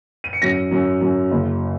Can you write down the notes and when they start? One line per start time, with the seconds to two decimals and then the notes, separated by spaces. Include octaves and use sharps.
0.24 D#7
0.33 C#7
0.42 F#2 A#6
0.71 F#2
1.01 F#2
1.31 F#1